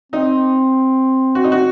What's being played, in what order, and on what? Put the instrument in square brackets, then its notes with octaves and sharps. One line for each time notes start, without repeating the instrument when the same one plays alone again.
[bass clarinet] C4 [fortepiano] D#4
[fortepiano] F#4
D#4
F#4